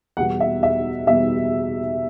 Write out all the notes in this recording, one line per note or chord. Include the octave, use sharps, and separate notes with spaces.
E2 B2 G3 F#5
E5
E5
E2 B2 G3 E5